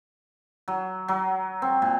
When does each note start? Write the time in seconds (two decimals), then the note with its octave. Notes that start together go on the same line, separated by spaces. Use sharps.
0.68 F#3
1.08 F#3
1.62 C4
1.82 A#2